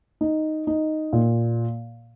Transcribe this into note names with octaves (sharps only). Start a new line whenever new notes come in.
D#4
D#4
A#2